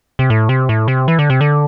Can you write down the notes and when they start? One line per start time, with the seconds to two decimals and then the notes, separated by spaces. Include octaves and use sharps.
0.19 C3
0.30 A2
0.49 C3
0.69 A2
0.88 C3
1.08 E3
1.19 D3
1.30 C3
1.41 D3